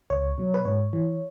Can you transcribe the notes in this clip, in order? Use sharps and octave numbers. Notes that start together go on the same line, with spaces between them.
C#2 C#5
B2 F#3
B4
G#2 C#5
E3